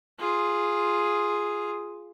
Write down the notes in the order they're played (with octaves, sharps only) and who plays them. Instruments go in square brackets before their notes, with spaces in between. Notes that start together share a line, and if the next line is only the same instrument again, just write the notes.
[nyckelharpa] F4 G#4